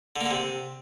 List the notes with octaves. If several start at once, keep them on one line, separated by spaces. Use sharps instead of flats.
D3
A#3
D3
C3